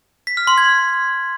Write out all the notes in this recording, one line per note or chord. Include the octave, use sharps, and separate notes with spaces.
B6
F6
C6
G#6